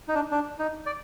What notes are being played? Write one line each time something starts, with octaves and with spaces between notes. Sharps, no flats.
D#4
D4
D4
D#4
D5